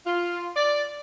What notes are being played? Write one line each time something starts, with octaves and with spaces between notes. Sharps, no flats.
F4
D5